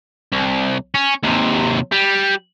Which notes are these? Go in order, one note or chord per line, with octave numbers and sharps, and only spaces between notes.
C2
C#4
D#2 C3
G3